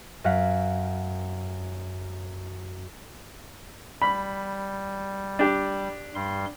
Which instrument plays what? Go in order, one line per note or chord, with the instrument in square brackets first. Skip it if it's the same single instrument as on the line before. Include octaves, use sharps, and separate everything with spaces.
[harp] F#2 F5 F#5 B6
[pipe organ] G3 [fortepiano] B5
[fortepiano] D4 G4
[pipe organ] G2 G3 C6